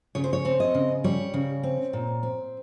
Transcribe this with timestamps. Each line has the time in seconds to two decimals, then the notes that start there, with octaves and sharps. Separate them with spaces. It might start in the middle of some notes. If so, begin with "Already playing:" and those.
0.15 C#3 C#5
0.24 C5
0.33 C#5
0.45 C4
0.60 D#5
0.74 C#3
1.04 G3 C#5
1.34 C#3
1.63 C4
1.93 A#2
2.23 C4